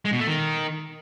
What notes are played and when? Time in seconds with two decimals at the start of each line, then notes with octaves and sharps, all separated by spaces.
0.05 G#3
0.12 B2
0.20 A3
0.27 D#3